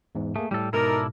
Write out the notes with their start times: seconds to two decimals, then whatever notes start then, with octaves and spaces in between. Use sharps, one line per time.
0.15 E2 G#2
0.36 A3 A#3 G#4
0.51 A2 G3 A4
0.73 G#2 B2 D#4 E4 A4 A#4 D5